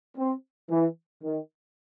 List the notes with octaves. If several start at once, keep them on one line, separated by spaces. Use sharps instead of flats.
C4
E3
D#3